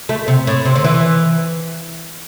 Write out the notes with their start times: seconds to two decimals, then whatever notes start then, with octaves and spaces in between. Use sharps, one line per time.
0.09 A3
0.28 C3
0.47 A2
0.65 C3
0.75 D3
0.84 E3